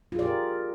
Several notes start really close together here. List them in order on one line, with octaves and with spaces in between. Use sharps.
F4 G#4 D5 G4 A#4